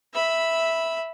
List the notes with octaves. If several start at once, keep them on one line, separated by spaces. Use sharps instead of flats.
E5 B5